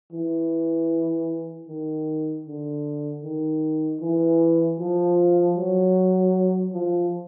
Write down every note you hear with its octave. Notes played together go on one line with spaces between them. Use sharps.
E3
D#3
D3
D#3
E3
F3
F#3
F3